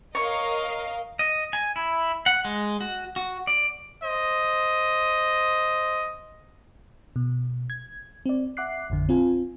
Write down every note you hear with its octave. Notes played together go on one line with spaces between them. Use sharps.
A#4 C#5 D#5 F5 C#6
D#5
G#5
E4
F#5
G#3
F#4
F#4
D5
C5 D#5
B2
G#6
C4 D5
E5 F#5 D6 F#6 C7
A1 F2 D3
C4 F4 G#5